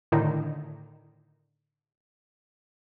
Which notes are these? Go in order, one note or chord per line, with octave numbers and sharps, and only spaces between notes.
A2 D3 D#3 D#4 E4